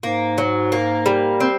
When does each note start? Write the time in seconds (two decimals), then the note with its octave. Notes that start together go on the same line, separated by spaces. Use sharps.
0.03 G#2 A#3
0.38 F#3
0.72 A#3
1.06 G3
1.40 C4